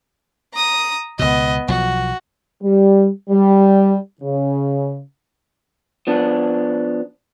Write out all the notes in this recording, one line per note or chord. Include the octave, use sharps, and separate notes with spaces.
A#5 D#6
C#2 B2 B3 D#5
B1 F3 F#4
G3
G3
C#3
F3 B3 D4